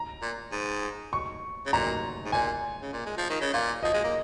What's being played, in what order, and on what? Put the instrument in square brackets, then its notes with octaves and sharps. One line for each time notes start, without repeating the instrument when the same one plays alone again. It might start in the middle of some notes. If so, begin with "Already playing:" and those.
Already playing: [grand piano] A#5
[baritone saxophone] A#2
G#2
[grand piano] C#6
[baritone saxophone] C#3
[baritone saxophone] A#2 [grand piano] A#5
[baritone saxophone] G#2
[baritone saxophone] A#2 [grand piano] G#5
[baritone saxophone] C#3
A#2
G#3
F3
D#3
C#3
[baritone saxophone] A#2 [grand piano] F5
[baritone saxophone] F3 [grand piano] D#5
[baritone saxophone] G#3
A#3